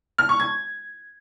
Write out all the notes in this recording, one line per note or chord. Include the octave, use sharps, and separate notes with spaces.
F6
C#6
G#6